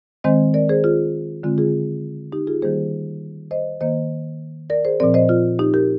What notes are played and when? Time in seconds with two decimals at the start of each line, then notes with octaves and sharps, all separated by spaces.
0.24 D#3 G#3 C4 C5 D#5
0.54 A#4 D5
0.69 G#4 C5
0.84 F4 G#4
1.43 D3 G#3 C4 F4
1.58 F4 G#4
2.32 D#4 G4
2.47 F4 G#4
2.62 D#3 G3 A#3 G#4 C5
3.51 C5 D#5
3.81 D#3 A#3 C5 D#5
4.70 A#4 D5
4.85 G#4 C5
5.00 A#2 F3 C4 A#4 D5
5.14 C5 D#5
5.29 F4
5.59 D#4 G4
5.74 G4 A#4